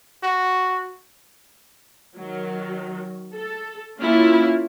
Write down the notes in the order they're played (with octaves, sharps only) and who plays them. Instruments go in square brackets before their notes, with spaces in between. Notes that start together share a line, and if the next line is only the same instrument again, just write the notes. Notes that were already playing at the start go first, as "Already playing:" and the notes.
[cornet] F#4
[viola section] D#3 F#3
A4
A#3 C#4 E4 F4